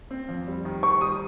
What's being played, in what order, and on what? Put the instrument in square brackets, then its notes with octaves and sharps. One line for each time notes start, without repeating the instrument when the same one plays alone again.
[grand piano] C4
F2
G3
D#3
[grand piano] C5 [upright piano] C#6
[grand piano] G3 [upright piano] D#6